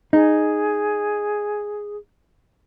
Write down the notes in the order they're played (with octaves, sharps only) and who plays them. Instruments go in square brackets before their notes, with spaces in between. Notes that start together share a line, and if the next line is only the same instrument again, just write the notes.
[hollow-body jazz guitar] D#4 [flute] G#4